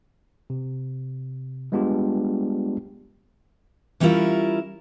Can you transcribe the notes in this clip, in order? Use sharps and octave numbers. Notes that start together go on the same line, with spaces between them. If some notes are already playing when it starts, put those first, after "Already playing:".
C3
G3 G#3 B3 D4 F4 G4
E3 G3 C#4 E4 F4 A#4